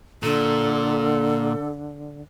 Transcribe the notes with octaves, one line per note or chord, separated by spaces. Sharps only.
A#2 D3 A4